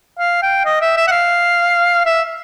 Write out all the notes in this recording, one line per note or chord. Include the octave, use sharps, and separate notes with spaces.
F5
G5
D#5
E5
E5
F#5
F5
E5